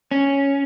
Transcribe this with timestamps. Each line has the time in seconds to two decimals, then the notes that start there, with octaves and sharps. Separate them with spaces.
0.11 C#4